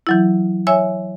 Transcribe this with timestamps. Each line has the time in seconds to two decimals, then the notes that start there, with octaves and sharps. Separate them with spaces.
0.07 E3 F#3 E4
0.67 C#5 E5 G#5 E6